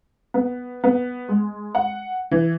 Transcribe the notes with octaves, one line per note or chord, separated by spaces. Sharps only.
B3
B3
G#3
F#5
E3